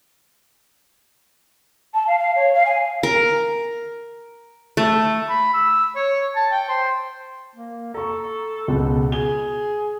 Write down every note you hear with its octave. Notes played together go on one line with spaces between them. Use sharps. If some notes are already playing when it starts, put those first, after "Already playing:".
A5
F5
F5
C#5
F5
G#5
A#4
A3
B5
E6
C#5
A5
G5
C5
A#3
A4 A#5 C#6
C#2 B2
G#4 G7